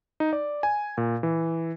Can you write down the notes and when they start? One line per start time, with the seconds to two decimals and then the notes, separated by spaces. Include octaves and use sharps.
0.20 D#4
0.33 D5
0.63 G#5
0.98 A#2
1.23 E3